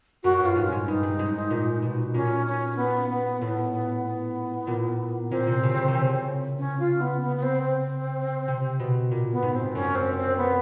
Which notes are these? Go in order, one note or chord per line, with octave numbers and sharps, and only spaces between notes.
F#2 F#4
G2 F#4
F4
G#2
C#4
G#2
G2 D#4
G#2
G#2
A#2
B2
A#2 C#4
C#4
B3
B3
A2 B3
B3
B3
A#2
A#2 C4
C3
C#3
C#3
C3
C#3
C#4
F4
B3
B3
B3
C4
C4
C3
B2
A#2
B3
G#2
C4
F#2 C#4
C4
C4
B3